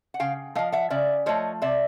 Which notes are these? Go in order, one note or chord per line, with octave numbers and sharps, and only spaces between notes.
F#5
C#3 F5 G5
F3 A3 D#5 F5
E5 F#5
C#3 D5 E5
F3 A3 C#5 D#5
C3 D5 E5